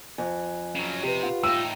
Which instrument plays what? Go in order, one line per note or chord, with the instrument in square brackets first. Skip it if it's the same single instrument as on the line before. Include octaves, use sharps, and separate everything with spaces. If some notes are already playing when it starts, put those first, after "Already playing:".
[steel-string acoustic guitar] F2 [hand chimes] G#5 F#6
[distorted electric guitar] C#3 F#3
[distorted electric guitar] C3 [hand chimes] G4 B4
[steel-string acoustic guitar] F4 [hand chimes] F#5
[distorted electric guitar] A2 D#4 [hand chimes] G5 [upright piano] E6